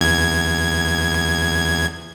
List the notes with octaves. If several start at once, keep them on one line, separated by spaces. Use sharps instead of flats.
E2 G#6